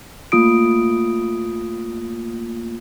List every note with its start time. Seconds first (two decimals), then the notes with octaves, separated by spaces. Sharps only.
0.32 A3 A#3 F4 D#6 D7